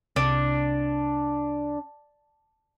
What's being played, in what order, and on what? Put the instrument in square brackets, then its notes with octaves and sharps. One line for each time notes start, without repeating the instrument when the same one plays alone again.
[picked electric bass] C2 [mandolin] D4